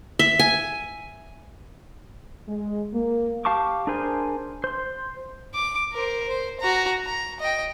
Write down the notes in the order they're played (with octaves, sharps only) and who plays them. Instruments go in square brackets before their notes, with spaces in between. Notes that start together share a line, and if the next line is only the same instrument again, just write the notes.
[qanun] E5
G#5
[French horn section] G#3
A#3
[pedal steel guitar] G4 F5 A5 C#6 D6
D4 G#4 A#4 C5 G#5
C5 C6
[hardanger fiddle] D6
A#4 C5
C5
F#4 A#5
A#5
D#5 G5